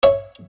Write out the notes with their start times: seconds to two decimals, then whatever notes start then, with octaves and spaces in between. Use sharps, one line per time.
0.03 C#5 E5